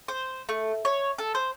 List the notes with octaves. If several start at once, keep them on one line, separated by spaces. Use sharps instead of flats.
C5
A3
C#5
A4
C5